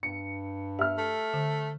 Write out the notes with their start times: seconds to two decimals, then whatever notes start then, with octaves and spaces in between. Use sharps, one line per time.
0.03 G2 C#7
0.79 G4 E5 F6
0.98 A3
1.34 D3